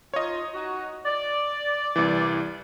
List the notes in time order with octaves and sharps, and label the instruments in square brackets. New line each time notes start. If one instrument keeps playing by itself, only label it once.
[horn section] D#4 F4 [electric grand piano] C#5 D#5
[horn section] D#4 F#4
D5
[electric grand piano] C2 E3